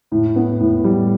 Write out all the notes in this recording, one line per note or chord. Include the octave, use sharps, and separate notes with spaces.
A2
B3
A2
G3